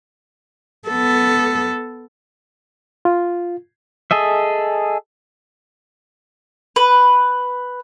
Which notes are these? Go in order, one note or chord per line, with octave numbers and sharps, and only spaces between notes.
B3 A4
F4
G#4 A4 D#5 E5
B4